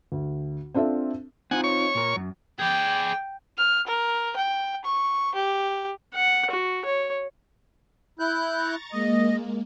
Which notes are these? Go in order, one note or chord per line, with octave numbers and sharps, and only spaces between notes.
D2
C4 D4 F4 A4 E5
C4 D#4 F4 F#5 G#5
C#5 C#6
A#2 A#4
F#2
G#4 D5 G5
F6
A#4
G5
C#6
G4
F#5
F#4
C#5
E4 F#6 G6
A#5 C#6 A6
G#3 A#3 D#5